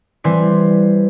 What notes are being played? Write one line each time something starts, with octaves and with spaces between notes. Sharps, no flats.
E3 G3 C4 C5 G#5 B6